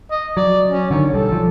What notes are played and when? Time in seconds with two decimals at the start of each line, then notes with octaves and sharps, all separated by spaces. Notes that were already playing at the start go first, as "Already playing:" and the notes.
0.11 D#5
0.37 F#3 D5
0.70 C#4
0.91 D3 D#3 C#5
1.12 B1 G3 A4
1.32 F3